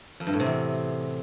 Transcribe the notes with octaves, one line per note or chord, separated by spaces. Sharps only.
F2
G2
A2
C3
E2